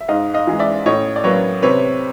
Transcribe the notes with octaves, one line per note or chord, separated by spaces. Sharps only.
E5
G#2 D#5 F5
D#5 F5
E3 G#3
D5 E5
A2 C#5 D#5
D5
F#3 A#3 B4 C#5
C3 B4 C#5